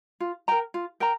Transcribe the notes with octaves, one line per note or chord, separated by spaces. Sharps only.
F4
A#4 G5 A#5
F4
A#4 G5 A#5